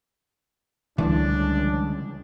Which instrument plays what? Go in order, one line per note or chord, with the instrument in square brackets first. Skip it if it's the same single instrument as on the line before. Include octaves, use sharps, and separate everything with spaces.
[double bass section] C#2 [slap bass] D3 G3 A3 [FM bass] E3 [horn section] D4